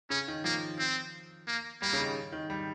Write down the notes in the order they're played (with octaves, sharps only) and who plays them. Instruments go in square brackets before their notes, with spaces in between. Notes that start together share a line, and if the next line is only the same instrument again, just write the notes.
[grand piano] C#3 [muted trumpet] C#4
[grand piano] D#3
[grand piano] F3 [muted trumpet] A#3
[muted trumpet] C4
A#3
[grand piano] G3 [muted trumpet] A#3
[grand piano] C#3
D#3
D#3
G3